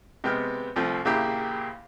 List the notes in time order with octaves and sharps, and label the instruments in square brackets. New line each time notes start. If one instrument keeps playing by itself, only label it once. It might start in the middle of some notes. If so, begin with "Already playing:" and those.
[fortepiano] C3 G#3 B3 G5 F6
C2 F3 A3 C4
A#1 C#3 A#3 E4 G4 G5